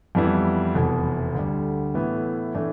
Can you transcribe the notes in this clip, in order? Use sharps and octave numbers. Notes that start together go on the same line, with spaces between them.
F2 E3 G3 B3 E4
F1 E2 B2
D2 D3 G3
A2 E3 B3 E4
A2 E3 A3 D4